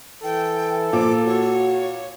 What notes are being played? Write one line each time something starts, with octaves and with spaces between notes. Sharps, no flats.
E3 A4 G5
A#2 F3 D6
F#4 C#5